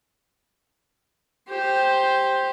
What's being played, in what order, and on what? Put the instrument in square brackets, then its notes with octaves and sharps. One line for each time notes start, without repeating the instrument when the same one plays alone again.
[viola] G4 C5